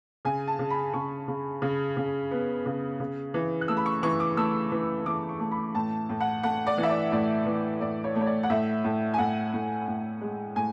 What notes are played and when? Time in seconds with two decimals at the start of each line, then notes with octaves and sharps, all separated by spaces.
0.25 C#3 G#5
0.47 A5
0.59 C#3
0.70 B5
0.93 C#3 C#6
1.28 C#3
1.62 C#3
1.97 C#3
2.31 B3
2.66 C#3
3.00 C#3
3.34 E3
3.61 F#6
3.68 A3 E6
3.77 B5
3.86 C#6
4.03 E3 C#6
4.20 D6
4.37 A3 E6
4.72 E3
5.06 E3 D6
5.29 C#6
5.40 A3
5.51 B5
5.75 A2 A5
6.09 A2
6.20 F#5
6.43 A3 F#5
6.67 D5
6.78 E3
6.83 E5
6.89 D5
7.12 A2 D5
7.46 E3
7.81 A2 D5
8.04 C#5
8.15 A3
8.21 C#5
8.26 D5
8.43 F#5
8.50 A2 E5
8.84 A2
9.14 G#5
9.18 A2 F#5
9.53 A2
9.88 A2
10.21 G#3
10.56 A2 G#5